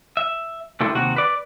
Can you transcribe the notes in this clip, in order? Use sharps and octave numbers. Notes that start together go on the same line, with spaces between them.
E5
C#2 G3 A3 D4 E4 C6
D#2 C3 F#4
B4 D5